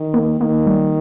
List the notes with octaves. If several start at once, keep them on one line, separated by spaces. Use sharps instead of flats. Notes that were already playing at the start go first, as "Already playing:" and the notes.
Already playing: D#3
A#3
D#3 A#3
G3